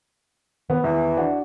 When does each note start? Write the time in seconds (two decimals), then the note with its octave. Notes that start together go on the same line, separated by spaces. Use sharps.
0.70 D#3 B3 B4
0.84 E2 E3
1.17 D4 F#4